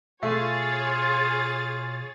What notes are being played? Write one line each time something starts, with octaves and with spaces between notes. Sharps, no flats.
B2 A3 F4 G#4 C#5 A6